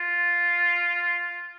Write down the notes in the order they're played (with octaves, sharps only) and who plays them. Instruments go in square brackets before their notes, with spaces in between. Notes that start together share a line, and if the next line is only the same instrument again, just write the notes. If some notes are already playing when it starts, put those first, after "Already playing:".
Already playing: [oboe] F4